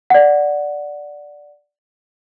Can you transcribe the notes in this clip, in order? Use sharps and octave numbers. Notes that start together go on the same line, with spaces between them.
D5 F#5